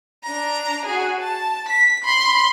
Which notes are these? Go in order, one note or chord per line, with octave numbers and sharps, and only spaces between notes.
D4 A#5
F#4 G#4
A5
B6
B5 C6